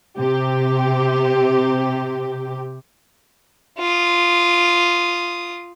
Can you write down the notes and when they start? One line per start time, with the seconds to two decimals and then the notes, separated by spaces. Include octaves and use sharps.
0.18 C3 G4
3.78 F4 D#6